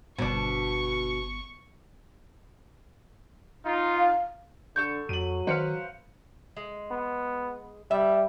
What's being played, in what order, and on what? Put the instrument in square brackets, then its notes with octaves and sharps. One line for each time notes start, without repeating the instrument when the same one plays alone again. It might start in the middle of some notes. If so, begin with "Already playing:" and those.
[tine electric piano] G1 B3 [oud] B2 D4 [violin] C#6
[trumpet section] D#4 F4
[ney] F5
[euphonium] D3 [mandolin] A4 C#6 G6
[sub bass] F2 [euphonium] F#3 [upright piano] D#7 F#7
[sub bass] D#3 [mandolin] B4 F5 [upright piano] C5 C#7
[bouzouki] G#3
[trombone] B3
[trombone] G3 [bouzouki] E5